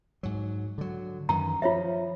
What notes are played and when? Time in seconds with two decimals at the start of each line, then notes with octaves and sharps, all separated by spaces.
0.23 G#2 F#3
0.78 D3 F#3
1.29 F#2 D#3 E3 A#5
1.62 F3 F4 C#5 E5